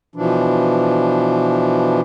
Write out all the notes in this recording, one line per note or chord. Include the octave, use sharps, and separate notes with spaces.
B2 E3 F3 D4